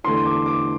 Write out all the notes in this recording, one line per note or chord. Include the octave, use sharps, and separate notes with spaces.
E2 D3 A3 C6
D6
D6